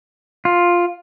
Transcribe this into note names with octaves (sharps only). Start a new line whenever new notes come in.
F4